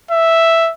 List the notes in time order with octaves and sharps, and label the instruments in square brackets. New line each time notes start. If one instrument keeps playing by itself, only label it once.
[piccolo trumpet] E5